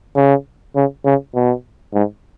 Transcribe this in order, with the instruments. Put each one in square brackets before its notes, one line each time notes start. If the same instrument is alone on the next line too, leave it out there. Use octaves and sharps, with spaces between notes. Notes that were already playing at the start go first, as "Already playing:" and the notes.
[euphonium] C#3
C#3
C#3
B2
G#2